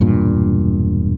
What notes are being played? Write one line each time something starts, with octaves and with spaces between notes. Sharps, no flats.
E1 G2 A#2